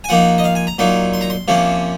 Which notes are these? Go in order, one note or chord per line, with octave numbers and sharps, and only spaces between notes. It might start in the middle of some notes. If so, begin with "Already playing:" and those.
G#5
F3 A#3 D#4 F#5
D#5
F5
G#5
A#5
A#2 F#3 A#3 D#4 C6
C6
A#5
C6
C3 F3 A#3 C#4